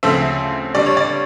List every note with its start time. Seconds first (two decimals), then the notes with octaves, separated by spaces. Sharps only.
0.03 D2 C#3 F3 A3 C4 E5
0.75 G2 D3 G3 D5
0.86 C#5
0.97 D5